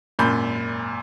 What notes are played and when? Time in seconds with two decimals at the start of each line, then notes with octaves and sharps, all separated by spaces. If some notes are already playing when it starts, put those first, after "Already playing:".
0.19 G#1 F#2 A#2 B5 G6